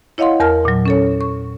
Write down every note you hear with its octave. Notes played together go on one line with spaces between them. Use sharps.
E4 C#5 D#5 F5 F#5 C6
E2 A#4 A5 F6
A#2 F#3
C#4 A4 C#5
C#6